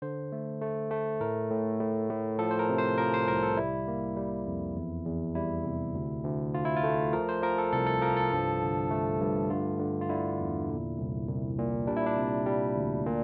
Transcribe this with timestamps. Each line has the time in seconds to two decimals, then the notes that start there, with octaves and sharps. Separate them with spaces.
0.02 D3 C5
0.32 A3
0.61 A3
0.91 A3
1.21 A2 A#4
1.50 A2
1.80 A2
2.10 A2
2.39 F3 A4
2.51 C5
2.59 A#4
2.69 C3
2.78 C5
2.98 F3 A#4
3.14 C5
3.28 C2 A#4
3.43 A4
3.57 G3 E4
3.88 A#3
4.16 G3
4.47 F2
4.76 E2
5.06 E2
5.35 G3 E4
5.65 C3
5.94 D2
6.24 D2
6.54 D2 F4
6.65 E4
6.77 F4
6.84 A3
7.13 F3 A#4
7.29 C5
7.43 F3 A#4
7.58 A4
7.73 C2 A4
7.87 A4
8.02 F3 A#4
8.17 A4
8.32 G2
8.62 D3
8.91 A3
9.20 G2
9.50 D3 F4
9.80 D3
10.01 F4
10.09 D3 E4
10.40 E2
10.69 A#2
10.98 C2
11.28 C2
11.58 A#2
11.87 G3 D4
11.96 E4
12.06 D4
12.17 C3
12.46 G3
12.76 D2
13.06 A#2